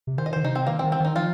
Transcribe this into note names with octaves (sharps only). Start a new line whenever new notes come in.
C3
D#3 C5
D#5
D#3 C5
C3 D#4
C4
D#3 A#3
C4
D#3
C4
D#3 D#4
F3 F4